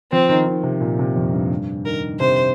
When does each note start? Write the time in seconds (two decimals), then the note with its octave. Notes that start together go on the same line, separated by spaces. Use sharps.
0.12 F3 C4
0.29 D#3
0.46 D#3
0.63 C3
0.81 A#2
0.99 C3
1.16 F2
1.33 G2
1.50 G2
1.85 D#3 A#4
2.20 C3 C5